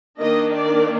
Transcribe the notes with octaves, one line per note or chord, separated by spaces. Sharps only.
D#3 A#3 D4 D#5
D5